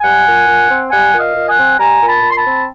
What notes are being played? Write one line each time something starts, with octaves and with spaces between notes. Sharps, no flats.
G3 F#5 G#5
A#2
A#2
C4
G3 F#5 G#5
A#2
D#5 F5
A#2
F#5 G#5
C4
G3 G#5 A#5
A#2
A5 B5
A#2
C6
A5 B5
C4